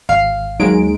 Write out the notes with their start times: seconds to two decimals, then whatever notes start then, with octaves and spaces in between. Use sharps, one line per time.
0.09 G#1 F5
0.60 D#2 F#3 G#3 D#4 G#4 D7